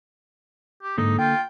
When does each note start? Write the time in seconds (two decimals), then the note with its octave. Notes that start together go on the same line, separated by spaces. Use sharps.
0.83 G4
0.98 G#2 D3 A#3 D#4 A4
1.19 F4 G5